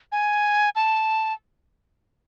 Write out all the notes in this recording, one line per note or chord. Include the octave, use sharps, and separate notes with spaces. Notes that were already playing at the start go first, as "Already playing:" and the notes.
G#5
A5